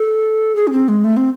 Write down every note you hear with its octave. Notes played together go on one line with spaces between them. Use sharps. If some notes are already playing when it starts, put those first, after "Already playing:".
Already playing: A4
G#4
C#4
C4
G#3
A3
C4